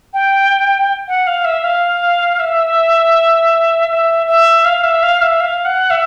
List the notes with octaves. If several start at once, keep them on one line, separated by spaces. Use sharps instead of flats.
G5
F#5
F5
E5
F5
E5
E5
E5
F5
E5
F5
E5
F5
F#5
E5